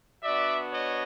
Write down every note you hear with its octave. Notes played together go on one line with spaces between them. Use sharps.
B3 D4 F#4 D5 E5
C#5 D#5